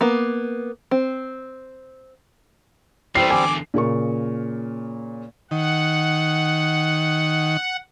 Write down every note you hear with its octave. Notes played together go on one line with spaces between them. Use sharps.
A#3 B3
C4
E3 G3 A3 C4 C5 C7
E2 D3 G#5 D6
A#2 C#3 A#4 C#6
D#3 F#5